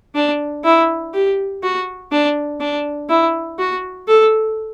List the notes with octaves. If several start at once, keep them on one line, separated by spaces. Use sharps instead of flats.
D4
E4
G4
F#4
D4
D4
E4
F#4
A4